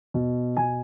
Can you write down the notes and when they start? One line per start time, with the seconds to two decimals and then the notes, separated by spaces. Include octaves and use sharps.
0.14 B2
0.57 B2 G#5